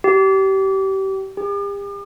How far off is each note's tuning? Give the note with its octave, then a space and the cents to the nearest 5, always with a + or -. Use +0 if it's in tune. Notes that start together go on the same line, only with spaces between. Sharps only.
G4 -30
G4 +40